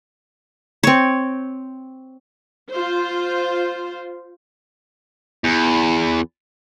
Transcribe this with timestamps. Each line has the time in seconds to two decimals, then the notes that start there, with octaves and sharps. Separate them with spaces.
0.83 C4 C#5
2.71 F4 C5
5.44 E2